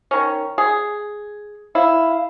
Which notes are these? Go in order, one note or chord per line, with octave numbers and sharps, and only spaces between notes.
D#3 C#4
G#4
E4 F5